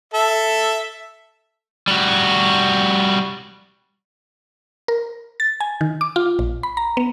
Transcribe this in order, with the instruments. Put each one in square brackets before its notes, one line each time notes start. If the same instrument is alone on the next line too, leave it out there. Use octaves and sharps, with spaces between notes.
[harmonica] A4 E5
[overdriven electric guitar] G3 F#4
[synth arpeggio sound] A#4
A6
G#5
D#3
D6
F4
A#1
B5
A#5
B3